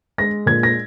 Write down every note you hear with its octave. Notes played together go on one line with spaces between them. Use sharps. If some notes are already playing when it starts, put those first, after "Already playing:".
G#3 A#6
A#2 G#6
A#6